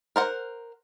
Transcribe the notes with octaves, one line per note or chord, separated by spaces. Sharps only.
A#4 C5 F#5